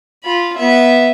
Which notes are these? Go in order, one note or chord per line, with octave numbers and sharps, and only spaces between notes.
F4 B5
B3 E5